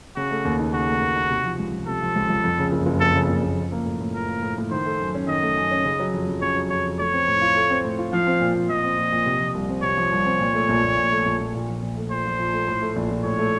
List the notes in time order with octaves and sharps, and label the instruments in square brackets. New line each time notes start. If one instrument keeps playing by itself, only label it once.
[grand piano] C#3 [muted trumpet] F#4
[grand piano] A3
D#2
D#4
[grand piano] C#3 [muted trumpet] F#4
[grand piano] A3
D#2
D#4
C3
F3
C#2
C#2
[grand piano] C3 [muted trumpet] A4
[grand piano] F3
C#2
C#2
F2
C#3
F#1
F#1
[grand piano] F2 [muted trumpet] A4
[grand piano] C#3
F#1
F#1
F3
A#3
A2
A2
[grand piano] F3 [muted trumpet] A#4
[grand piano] A#3
A2
A2
[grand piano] D#3 [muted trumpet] C5
[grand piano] A3
F#2
C#4
[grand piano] D#3 [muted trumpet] D#5
[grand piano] A3
F#2
C#4
C#3
F#3
F2
F2
[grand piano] C#3 [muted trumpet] C#5
[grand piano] F#3
[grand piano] F2 [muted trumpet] C#5
[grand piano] F2
[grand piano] A3 [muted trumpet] C#5
[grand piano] C4
A2
F4
A3
C4
A2
F4
[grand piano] F3 [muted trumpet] F5
[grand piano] C4
A#2
A#2
[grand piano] F3 [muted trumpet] D#5
[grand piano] C4
A#2
A#2
C3
F3
C2
C4
[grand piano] C3 [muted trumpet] C#5
[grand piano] F3
C2
C4
A#2
A3
A#1
A#1
A#2
A3
A#1
A#1
A#2
F3
A#1
A3
[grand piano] A#2 [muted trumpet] C5
[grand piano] F3
A#1
A3
A2
A3
A#1
A#1
[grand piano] A2 [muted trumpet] C#5
[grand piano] A3